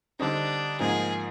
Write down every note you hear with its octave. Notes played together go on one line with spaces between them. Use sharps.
D3 G3 C4 D4 D#4
G#2 F3 A#3 G#4